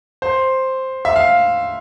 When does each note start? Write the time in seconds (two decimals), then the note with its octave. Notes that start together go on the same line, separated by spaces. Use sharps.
0.22 C5
1.05 E5
1.16 F5